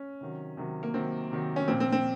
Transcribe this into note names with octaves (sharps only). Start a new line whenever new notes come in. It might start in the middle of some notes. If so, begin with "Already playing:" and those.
Already playing: C#4
C3 D#3 F#3
C3 D#3 F#3
A#3
C3 D#3 F#3 C4
C3 D#3 F#3
C#4
A#2 F3 C4
C4
C4